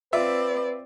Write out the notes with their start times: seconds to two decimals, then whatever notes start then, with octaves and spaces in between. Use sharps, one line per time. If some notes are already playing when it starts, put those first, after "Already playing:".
0.13 C4 F4 B4 D5 E5